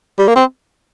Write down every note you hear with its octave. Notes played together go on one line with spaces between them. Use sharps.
G3
A#3
C4